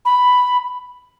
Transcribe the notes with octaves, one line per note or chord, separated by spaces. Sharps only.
B5